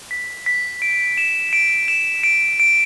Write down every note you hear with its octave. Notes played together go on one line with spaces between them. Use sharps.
B6
B6
D7
E7
D7
E7
D7
D7